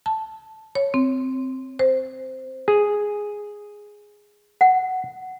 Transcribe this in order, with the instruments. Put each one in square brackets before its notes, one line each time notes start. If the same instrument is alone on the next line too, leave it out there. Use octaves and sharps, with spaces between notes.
[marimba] A5
C#5
C4
C5
[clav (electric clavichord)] G#4
[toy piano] F#5